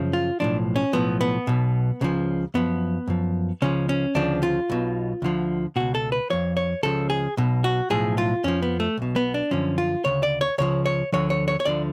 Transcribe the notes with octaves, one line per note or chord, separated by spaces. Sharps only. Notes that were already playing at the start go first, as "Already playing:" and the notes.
Already playing: F#2 C#3 F3
F4
B1 A2 F3 D4
C#4
B1 A2 F3 B3
B3
B1 B2
C#2 C#3 F3
F#2 F3 B3
F#2 F3
C#2 C#3 F3 C#4
C#4
D2 C#3 F3 D4
F4
B1 B2
D2 D3 F3
C#2 B2 F#4
A4
B4
F2 F3 C#5
C#5
C#2 C#3 F3 A4
G#4
B1 B2
F#4
B1 A2 F3 G#4
F4
F2 F3 C#4
B3
A3
B1 B2
B3
D4
F#2 D3 F3 C#4
F4
D2 C#3 C#5
D5
C#5
C#2 C#3 F3 C#5
C#5
D2 D3 F3 C#5
C#5
C#5
C#5
D2 D3 F3 D5